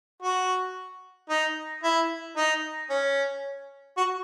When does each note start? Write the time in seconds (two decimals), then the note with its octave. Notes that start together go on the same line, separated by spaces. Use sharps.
0.22 F#4
1.29 D#4
1.83 E4
2.36 D#4
2.90 C#4
3.97 F#4